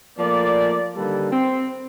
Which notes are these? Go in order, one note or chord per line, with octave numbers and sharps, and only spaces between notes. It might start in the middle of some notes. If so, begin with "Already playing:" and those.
F3 A3 A#3 D5
D3 D#3 G3 A#3 A4 B4
C4